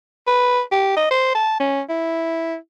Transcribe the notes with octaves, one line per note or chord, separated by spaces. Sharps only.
B4
G4
D#5
C5
A5
C#4
E4